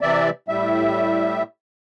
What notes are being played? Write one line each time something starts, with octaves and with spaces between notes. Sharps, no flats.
C3 E3 D5 E5
A2 G3 E5